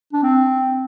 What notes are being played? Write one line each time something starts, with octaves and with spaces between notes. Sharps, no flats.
D4
C4